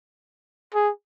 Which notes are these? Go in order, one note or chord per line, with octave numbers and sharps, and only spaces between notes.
G#4